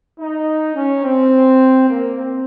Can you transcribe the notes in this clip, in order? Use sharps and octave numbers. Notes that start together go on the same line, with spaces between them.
D#4
C#4
C4
A#3
C4